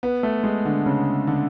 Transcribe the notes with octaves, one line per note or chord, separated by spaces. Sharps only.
B3
A3
G#3
D3
C#3
D3